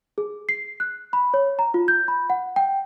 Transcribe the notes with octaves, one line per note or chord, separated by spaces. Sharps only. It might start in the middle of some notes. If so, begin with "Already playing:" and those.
G#4
C7
F#6
B5
C#5
A#5
F4
G6
B5
F#5
G5